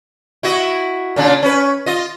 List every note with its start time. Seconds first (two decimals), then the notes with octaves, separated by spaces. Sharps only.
0.43 E4 F#4 D#5
1.16 A#2 C#3 D4
1.43 C#4 B4
1.86 F4 D#5